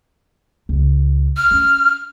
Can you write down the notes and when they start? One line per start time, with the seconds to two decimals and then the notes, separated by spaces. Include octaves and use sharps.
0.69 C#2
1.37 F6
1.51 C#4